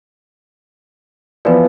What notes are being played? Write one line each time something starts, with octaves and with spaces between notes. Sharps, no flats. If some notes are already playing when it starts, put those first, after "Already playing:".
E3 F3 B3 B4 D5